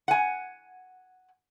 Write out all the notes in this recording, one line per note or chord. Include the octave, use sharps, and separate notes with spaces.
F#5 G#5